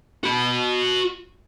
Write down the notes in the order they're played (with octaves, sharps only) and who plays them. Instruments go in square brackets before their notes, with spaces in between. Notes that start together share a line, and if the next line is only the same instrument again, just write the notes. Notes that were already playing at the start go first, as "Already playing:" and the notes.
[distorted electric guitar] F#4 B5